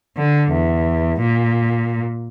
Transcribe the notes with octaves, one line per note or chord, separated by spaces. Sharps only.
D3
E2
A#2